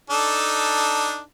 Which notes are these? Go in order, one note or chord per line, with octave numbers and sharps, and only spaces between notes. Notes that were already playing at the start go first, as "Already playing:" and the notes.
D4 D#4 A4